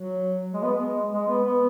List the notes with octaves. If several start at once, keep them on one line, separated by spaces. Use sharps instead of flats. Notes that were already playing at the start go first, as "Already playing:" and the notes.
Already playing: F#3
G#3
B3
G#3
G#3
B3
B3